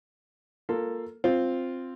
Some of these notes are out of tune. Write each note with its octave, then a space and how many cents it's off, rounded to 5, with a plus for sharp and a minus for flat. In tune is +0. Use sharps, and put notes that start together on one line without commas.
A#3 +0 F4 +0 A4 +10
C4 +0 F4 +0